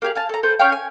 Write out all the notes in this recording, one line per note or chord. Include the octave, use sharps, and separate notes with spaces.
A#3 G4 G#4 F5
F5 G#5 A5
A4 A#5
A4 B4 C5 G5
C#4 C#5 F5 G5
G#5